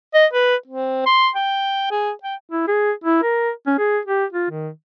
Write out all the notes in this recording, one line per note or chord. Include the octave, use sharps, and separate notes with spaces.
D#5
B4
C4
C6
G5
G#4
G5
E4
G#4
E4
A#4
C#4
G#4
G4
F4
D#3